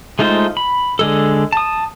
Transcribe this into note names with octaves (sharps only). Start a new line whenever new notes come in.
G#3 A3 D#4 F4 C5
B5
D3 G#3 A4
A5 D#6